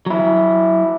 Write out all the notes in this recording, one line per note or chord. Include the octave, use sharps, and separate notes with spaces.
F#3 E4